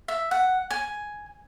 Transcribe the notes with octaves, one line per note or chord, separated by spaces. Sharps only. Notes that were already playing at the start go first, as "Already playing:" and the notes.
E5
F#5
G#5